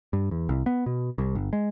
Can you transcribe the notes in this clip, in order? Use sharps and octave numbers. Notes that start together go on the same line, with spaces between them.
G2
E2
C2
B3
B2
C2
G1
G#3